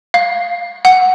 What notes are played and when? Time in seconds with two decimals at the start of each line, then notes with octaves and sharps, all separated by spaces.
0.14 F5
0.85 F#5